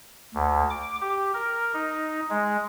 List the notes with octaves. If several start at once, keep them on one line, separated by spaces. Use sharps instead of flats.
D2
D6
G4
A#4
D#4
G#3